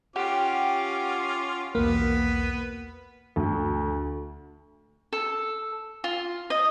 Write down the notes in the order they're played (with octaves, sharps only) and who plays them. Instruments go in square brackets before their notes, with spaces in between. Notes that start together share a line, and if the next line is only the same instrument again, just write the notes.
[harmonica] C#4 F4 D6 [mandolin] G4 [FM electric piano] F#5
[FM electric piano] B1 E2 A#3 [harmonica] B3 B4
[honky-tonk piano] D2
[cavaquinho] A4
F4
D#5